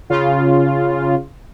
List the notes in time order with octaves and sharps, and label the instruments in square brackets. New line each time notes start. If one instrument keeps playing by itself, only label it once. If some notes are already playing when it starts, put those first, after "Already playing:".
[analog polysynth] C#3 F4